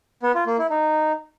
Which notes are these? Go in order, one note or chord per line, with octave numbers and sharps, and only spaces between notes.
B3
F4
A#3
E4
D#4